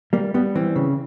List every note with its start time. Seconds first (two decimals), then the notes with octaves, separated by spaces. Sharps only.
0.13 G3 A#3
0.34 G3 B3
0.55 E3 C4
0.76 C#3